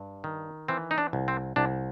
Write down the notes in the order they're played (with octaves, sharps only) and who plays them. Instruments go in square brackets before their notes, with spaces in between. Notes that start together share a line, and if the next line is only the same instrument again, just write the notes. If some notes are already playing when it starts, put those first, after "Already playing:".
Already playing: [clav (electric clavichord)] G2
D#3
E3 C4
D#4
D4
C2
C4
C2 D4